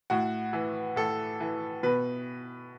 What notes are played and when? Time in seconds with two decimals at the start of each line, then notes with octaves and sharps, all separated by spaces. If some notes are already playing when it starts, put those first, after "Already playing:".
0.10 A2 F#4
0.53 E3
0.96 A2 A4
1.40 E3
1.83 B2 B4